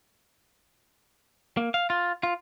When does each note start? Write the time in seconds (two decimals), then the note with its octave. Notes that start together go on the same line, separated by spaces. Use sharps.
1.57 A#3
1.74 F5
1.90 F4
2.23 F4